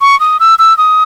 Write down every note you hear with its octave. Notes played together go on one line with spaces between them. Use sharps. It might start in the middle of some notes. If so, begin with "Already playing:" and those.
C#6
D#6
E6
E6
D#6